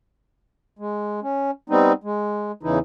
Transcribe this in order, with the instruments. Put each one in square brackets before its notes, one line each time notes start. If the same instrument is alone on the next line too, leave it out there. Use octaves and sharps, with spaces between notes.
[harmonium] G#3
C#4
G3 B3 C4 D#4
G#3
E2 C#3 E3 D#4 E4